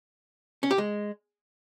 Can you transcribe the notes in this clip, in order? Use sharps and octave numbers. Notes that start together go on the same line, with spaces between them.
C#4
G4
G#3